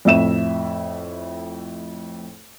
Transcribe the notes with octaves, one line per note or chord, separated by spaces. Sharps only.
F2 A2 E5 E7